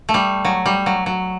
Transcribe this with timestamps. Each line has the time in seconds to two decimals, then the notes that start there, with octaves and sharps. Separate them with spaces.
0.09 A3
0.14 G3
0.45 F#3
0.66 G3
0.86 F#3
1.06 F#3